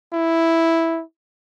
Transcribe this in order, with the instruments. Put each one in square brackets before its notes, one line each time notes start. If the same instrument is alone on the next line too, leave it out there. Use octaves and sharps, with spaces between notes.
[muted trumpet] E4